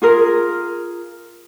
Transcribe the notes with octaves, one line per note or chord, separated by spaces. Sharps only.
F4 G#4 A#4